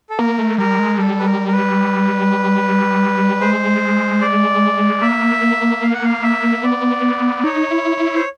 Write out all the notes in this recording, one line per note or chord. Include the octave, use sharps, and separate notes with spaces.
A4
A#3 A#4
A3
G3 A#4
G#3
G3 A4
B4
A#4
A#4
B4
G#3 C5
D5
A#3 E5
F5
F#5
F5
E5
B3 D5
D#4 C#5
E4
E4
C5